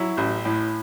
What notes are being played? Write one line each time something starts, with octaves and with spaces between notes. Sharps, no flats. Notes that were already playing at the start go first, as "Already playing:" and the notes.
Already playing: F#3 E4
A1
A2